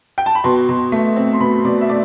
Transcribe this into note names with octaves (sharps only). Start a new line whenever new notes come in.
G5
A5
B5
B2 C6
B2
A3
C4
C6
B2 B5
B2 D5
E5
A3 D5